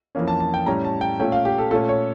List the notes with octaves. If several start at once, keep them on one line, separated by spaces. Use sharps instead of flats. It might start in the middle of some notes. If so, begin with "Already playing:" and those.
F2 E3 A#3 C#4
A5
A5
G5
A2 G3 C#4 A#5
A5
G5
A#2 A3 C#4 G5
F5
G4
A4
A#2 A3 C#4 A4
C#5